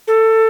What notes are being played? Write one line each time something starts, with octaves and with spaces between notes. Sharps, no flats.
A4